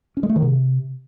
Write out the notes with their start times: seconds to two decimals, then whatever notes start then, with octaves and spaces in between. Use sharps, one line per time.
0.17 C#4
0.23 G#3
0.29 A3
0.36 D#3
0.42 C3